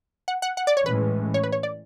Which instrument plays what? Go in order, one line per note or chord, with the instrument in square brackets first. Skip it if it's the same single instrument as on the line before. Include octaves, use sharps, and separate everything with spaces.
[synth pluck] F#5
F#5
F#5
D5
C#5
[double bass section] A2 E3 G#3 C#4 [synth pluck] B4
[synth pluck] C#5
B4
C#5
D5